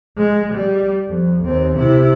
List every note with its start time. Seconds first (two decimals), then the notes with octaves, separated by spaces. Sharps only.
0.17 G#3
0.53 G3
1.08 F2
1.44 D#2 C4
1.78 C3 E4